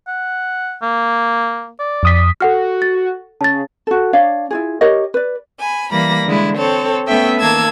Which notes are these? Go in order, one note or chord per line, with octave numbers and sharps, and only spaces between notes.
F#5
A#3
D5
F2 D#6 B6
F#4 A4 F#5 F6
A6
C#3 A5 A6
F#4 A4
D4 C#5 D5 F5
E4 F4 G#4
G4 A#4 C#5 D#5
B4 D5
G#5 B5
E3 G3 A#3 B5 A#6
D3 G#3 E4
C4 A4 C#5
A3 B3 C#4 A4 E5 G5
D#3 A#3 A5 E6 G#6